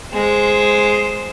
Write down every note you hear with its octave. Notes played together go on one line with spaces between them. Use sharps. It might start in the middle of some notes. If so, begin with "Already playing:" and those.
G#3 C5